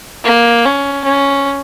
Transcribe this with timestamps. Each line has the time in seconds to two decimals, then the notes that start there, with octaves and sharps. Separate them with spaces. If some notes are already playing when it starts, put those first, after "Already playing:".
0.24 A#3
0.65 C#4
1.05 C#4